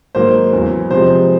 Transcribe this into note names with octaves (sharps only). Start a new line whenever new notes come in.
G#2 D#3 F#3 A#3 C5
E2 C#3 F#3
C3 F3 G#3 C5